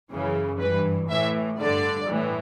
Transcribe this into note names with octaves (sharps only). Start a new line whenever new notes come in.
F#2 C#3 E3
G2 E3 B4
A2 E3 E5
G2 D3 D5
A2 E3